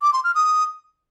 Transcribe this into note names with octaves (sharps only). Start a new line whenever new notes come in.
D6
C6
F6
D#6